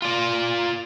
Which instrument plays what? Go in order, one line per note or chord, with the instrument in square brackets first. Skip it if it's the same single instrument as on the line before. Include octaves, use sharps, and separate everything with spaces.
[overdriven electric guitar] F4 D5